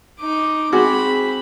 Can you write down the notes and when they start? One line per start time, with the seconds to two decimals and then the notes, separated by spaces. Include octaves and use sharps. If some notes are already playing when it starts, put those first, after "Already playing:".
0.19 D#4 D6
0.73 C4 F#4 G#4 G#5 B5 D6